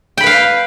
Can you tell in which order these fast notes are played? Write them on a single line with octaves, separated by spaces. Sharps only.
G5 B5 B4 F5